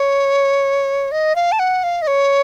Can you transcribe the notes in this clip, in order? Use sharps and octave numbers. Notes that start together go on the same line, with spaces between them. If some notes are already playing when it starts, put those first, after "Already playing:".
Already playing: C#5
D#5
F5
A5
F#5
F5
D#5
C#5